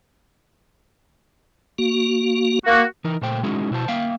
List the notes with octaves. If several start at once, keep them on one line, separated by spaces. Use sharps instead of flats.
A#3 F#4
A#3 F#4
E3 D#4 A#4
A#2 A3 C5 G5
G#3 C#4 D#4 E4 F#4 G#4
B2 E4 F#4 C5 A5
A#3 E5 F5 G5